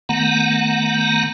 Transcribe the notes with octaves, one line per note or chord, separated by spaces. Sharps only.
D#3 A3 B3 F#5 A#5